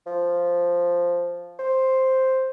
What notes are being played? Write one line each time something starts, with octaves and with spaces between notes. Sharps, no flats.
F3
C5